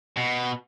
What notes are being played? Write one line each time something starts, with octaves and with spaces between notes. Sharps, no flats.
B2